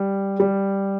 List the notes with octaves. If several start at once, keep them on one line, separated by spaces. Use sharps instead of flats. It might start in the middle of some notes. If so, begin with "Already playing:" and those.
Already playing: G3
G3